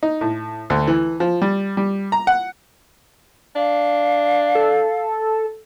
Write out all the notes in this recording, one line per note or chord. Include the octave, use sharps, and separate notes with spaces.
D#4
A2
D2
E3
F3
G3
G3
A#5
F#5
D4 F5
A4